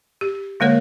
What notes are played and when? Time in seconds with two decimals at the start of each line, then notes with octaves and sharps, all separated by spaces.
0.21 G4
0.60 D3 G#3 A#3 A#4 C#5